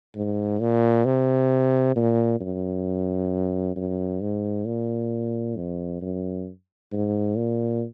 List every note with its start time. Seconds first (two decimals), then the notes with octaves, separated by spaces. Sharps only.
0.15 G#2
0.60 A#2
1.05 C3
1.96 A#2
2.40 F#2
3.76 F#2
4.21 G#2
4.65 A#2
5.57 F2
6.01 F#2
6.92 G#2
7.37 A#2